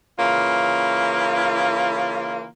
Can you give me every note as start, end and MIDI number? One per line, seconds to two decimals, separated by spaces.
0.19 2.47 49
0.19 2.47 52
0.19 2.47 58
0.19 2.47 65